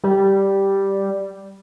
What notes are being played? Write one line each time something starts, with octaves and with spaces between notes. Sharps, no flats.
G3